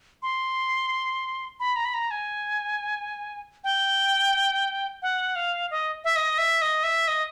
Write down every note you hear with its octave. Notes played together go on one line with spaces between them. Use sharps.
C6
B5
A#5
B5
A#5
G#5
G5
F#5
F5
D#5
E5
D#5
E5
D#5
E5
D#5